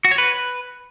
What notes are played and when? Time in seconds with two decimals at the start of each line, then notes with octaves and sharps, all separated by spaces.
0.05 F#4
0.11 C#5
0.18 B4